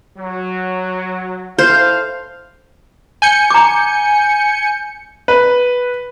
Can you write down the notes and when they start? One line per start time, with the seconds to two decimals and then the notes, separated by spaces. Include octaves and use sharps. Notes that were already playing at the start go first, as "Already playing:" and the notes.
0.18 F#3
1.58 E4 A4 C5 F5
3.22 G#5 G6 C#7
3.50 A#5 D6
5.28 B4